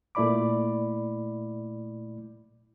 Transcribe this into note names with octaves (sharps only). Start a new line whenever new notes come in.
A#2 A3 E4 D5 B5 D6